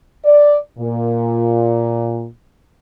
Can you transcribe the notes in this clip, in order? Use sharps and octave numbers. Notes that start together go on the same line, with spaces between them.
D5
A#2